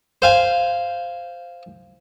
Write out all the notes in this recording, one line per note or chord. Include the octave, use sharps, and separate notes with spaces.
C5 F5 G#5